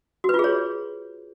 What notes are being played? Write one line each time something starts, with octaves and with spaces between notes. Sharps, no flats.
F#4
B4
F4
G#4
C#5